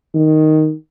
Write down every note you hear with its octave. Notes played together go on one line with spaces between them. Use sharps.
D#3